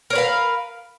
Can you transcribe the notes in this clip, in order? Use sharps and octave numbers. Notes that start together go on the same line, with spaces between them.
A#4 B4 C#5 F5